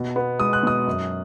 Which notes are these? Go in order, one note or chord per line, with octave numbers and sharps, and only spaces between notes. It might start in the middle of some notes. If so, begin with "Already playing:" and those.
Already playing: B2
B3
G#3 D#6
F#6
B2 D#6
F#2